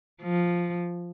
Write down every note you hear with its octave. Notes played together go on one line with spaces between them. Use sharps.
F3